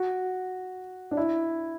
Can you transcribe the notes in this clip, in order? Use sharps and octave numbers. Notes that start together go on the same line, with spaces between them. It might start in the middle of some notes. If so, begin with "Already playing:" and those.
Already playing: F#4
D4
E4